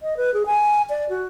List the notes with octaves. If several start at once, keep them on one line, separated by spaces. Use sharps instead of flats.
D#5
B4
G#4
G#5
D5
F#4